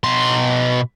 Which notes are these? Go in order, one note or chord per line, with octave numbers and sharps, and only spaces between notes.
B2 C6